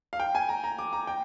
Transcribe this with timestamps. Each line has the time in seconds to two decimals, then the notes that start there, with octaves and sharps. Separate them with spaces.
0.13 F5
0.20 G5
0.35 G#5
0.49 A#5
0.64 A#5
0.79 D6
0.93 A#5
1.07 G5